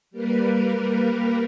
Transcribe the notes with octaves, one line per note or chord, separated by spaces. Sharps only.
G3 A#3 A#4 B4